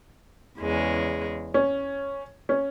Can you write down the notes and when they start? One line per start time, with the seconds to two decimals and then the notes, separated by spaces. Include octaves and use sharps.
0.60 E2 C#3 G#3
1.54 C#4
2.49 C#4